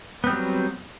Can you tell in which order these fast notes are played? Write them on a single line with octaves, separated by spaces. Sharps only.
B3 C4 G3 F#3